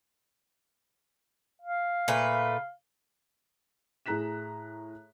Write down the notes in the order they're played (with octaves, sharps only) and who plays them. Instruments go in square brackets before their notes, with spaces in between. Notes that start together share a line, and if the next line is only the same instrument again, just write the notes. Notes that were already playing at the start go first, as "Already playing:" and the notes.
[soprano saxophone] F5
[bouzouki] A#2 A3 B4
[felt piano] A2 G#4 A#5 F#6 B6 E7